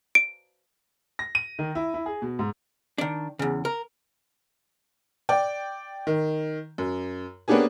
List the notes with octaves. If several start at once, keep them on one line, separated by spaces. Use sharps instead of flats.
D7
A#6
D#7
D#3
E4
E4
G#4
B2
G#2
D#3 D4
E2 C#3
A#4
D5 G5
D#3
F#2
A#3 B3 C#4 D4 G4 G#4